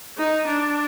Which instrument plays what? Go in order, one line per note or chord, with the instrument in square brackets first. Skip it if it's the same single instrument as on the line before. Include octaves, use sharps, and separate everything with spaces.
[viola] D#4
D4